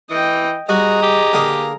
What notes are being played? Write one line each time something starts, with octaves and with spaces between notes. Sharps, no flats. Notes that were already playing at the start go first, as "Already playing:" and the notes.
E3 D#5 G5
G3 F#4 G#4 D#5 A#5
G4
D3 A#3 D#6